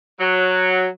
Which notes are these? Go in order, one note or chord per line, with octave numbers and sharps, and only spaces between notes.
F#3